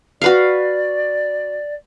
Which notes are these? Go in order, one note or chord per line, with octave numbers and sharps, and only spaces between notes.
F#4 B4 D5 F5